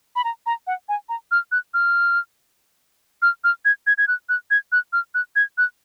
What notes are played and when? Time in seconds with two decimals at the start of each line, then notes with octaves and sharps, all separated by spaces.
0.16 B5
0.24 A#5
0.46 A#5
0.67 F#5
0.89 G#5
1.09 A#5
1.31 F6
1.52 F#6
1.74 F6
3.22 F6
3.44 F6
3.65 G#6
3.87 G#6
3.98 G#6
4.08 F#6
4.29 F#6
4.51 G#6
4.72 F#6
4.93 F6
5.14 F#6
5.36 G#6
5.58 F#6